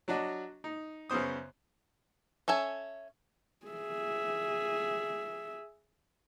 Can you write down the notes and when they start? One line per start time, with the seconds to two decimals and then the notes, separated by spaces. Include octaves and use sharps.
0.08 F#3 D4 F#4 D#5
0.64 D#4
1.10 F#2 C#3 B3 C5 D#6
2.48 C#4 A4 E5 G#5
3.66 G#4 E5